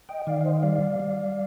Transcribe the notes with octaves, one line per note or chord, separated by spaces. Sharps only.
D#5 G5
D#3 D5 F5
F5
C5 D#5
G3 D5 F5
G3